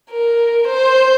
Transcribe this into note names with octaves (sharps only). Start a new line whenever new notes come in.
A#4
C5